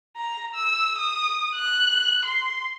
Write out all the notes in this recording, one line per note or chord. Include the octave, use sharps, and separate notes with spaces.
A#5
E6
D#6
F#6
C6